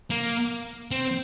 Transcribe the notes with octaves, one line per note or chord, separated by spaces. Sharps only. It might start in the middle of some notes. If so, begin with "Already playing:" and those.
A#3
C4